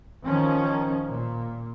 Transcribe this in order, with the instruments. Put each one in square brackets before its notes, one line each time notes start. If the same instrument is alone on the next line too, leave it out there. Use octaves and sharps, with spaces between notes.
[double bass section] D#3 F3 C#4
A#2